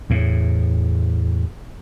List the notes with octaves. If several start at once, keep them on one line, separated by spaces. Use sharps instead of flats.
E2 A2